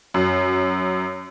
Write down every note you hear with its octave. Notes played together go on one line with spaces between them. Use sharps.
F#2